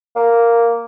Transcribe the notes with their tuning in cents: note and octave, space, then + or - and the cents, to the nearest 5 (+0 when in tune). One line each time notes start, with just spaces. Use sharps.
A#3 -5